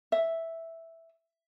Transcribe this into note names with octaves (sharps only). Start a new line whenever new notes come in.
E5